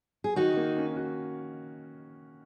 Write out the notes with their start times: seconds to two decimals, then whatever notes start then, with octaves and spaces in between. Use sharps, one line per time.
0.24 G#4
0.36 D#3 D#4 F#4
0.57 A#3
0.77 C#4
0.97 F#4